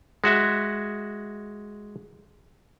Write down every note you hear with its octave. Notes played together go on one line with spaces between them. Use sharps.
G#3 F#4 E5